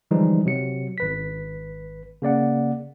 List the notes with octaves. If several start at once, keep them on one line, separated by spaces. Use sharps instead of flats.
D3 E3 F3 G3 G#3 D#4
C3 F#3 C#7
G#1 B4 B6
C#3 A#3 D5 F#5